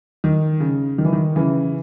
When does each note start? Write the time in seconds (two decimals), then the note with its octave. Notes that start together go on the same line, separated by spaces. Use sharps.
0.24 D#3
0.60 C#3
0.98 D#3
1.05 E3
1.13 D#3
1.36 C#3 E3